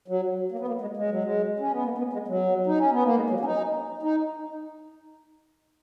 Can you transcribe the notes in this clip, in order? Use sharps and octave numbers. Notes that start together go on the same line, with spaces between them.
F#3
A#3
B3
A#3
G#3
G#3
F#3
G#3
C#4
B3
A#3
B3
G#3
F#3
D#4
C#4
B3
A#3
G#3
F#3
C#4
D#4
D#4